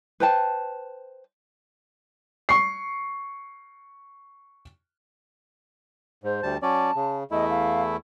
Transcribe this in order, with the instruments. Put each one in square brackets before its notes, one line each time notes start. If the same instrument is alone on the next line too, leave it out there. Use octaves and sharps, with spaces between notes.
[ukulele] B4 C5 G5 A5
[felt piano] C#6 C7
[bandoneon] G#2 [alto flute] C5
[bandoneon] D2 G3 A5
[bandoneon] F#3 C#4 D5 [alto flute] A5
[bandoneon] C#3
[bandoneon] E2 A3 E4 [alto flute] D#5
[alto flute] F5